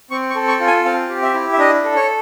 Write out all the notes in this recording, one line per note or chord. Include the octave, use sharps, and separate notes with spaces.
C4 C#6
C#6
A4
C#6
F4
G#5
C4 F5
G4
E5
E4
E5
D4 D#5
A4
C#5